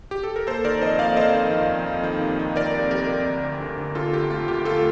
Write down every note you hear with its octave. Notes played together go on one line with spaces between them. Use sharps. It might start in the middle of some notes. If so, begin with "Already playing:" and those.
G4
A4
A#4
A#3 A4 C5
D#3 A#4 D5
F2 C5 D#5
A#3 D5 F5
F2 C5 D#5
D#3
F2
F2
F2
D#3
C3
D#3
D#3 A#4 D5
C3
F2 G4 A#4
C3
D2
D2
D3
D3
D3 F4 A4
D2 G4
A3 F4
D2 G4
A3 F4 A4